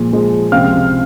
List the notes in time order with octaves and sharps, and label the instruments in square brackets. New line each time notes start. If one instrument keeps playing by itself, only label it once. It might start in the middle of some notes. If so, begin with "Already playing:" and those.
Already playing: [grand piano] A#2 F3 G#3
A#2 F3 G#3
C#2 C3 F3 C4 F5 F6